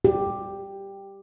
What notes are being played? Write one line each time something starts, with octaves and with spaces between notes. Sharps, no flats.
G4